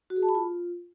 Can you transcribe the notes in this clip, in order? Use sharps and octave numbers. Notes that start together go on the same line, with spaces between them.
F#4
G#4
A5
B5
F4